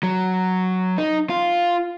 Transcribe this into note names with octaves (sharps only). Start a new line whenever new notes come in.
F#3
D#4
F4